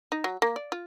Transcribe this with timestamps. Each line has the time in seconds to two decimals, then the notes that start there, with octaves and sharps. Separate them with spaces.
0.12 D#4
0.24 F#3
0.42 A#3
0.56 D5
0.72 F4